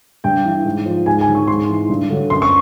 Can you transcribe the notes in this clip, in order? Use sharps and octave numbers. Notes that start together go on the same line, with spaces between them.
G2 G5
E3
G#2
F3
G#2 G#5
G#5
D#3 F#3
C#6
G#2 C6
E3
G2
D3 F#3
F#2 C6
C#6